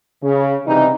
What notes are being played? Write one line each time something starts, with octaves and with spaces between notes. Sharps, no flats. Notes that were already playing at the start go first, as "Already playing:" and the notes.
C#3
C3 E3 G3 D#4